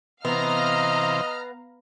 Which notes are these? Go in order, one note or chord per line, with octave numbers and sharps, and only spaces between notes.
C3 E3 B3 C5 D#5 F5 A#5 F6